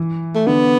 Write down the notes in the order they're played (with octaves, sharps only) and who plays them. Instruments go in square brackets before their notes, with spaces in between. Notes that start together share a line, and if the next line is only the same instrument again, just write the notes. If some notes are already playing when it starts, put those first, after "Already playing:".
Already playing: [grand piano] E3
[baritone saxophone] A3
[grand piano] D3 [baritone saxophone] B3